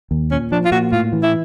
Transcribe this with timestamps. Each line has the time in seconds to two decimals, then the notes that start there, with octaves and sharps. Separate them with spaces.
0.11 D#2
0.31 A#2 C#4
0.52 F3 D4
0.65 F4
0.72 A#2 F#4
0.92 A2 F4
1.13 E3
1.23 E4